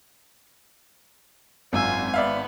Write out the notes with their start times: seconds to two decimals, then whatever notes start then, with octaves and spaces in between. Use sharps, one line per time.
1.73 G#1 F#2 F4 G#5 E6
2.14 B3 D5 E5 F5